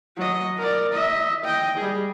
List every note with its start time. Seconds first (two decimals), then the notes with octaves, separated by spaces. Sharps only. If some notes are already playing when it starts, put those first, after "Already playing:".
0.17 F#3 D#5
0.58 A#4 D5
0.93 D#5 E5
1.44 D#5 G5
1.78 G3 G#4